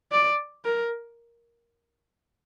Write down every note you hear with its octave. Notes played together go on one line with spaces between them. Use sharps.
D5
A#4